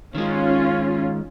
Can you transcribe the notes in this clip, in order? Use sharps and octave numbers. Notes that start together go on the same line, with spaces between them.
D#3 G#3 C#4 F4